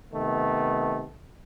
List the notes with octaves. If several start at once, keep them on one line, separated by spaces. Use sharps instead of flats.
C3 D#3 A3 B3